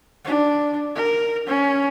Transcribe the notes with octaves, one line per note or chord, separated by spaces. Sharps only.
D4
A#4
C#4